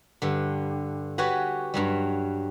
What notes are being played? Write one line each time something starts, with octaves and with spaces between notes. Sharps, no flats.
G2 D3
F#4 G4 B4 C#5 F#5 G#5
G2 F#3 G3